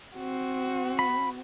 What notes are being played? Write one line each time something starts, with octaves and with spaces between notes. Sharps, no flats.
C4 F#4
B5